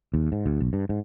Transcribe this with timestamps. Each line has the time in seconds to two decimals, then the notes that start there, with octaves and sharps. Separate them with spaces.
0.14 D#2
0.32 G#2
0.46 D2
0.60 B1
0.73 G2
0.89 G#2